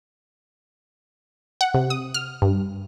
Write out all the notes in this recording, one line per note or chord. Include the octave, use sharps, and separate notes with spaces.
F#5
C3
D#6
F6
G2